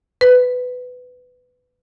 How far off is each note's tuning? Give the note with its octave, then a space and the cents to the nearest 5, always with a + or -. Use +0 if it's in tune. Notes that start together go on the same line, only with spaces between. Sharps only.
B4 +15